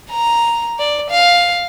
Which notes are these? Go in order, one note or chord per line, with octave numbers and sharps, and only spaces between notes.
A#5
D5
F5